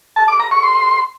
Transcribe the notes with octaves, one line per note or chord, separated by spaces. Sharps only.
A5
D6
A#5
C#6
C6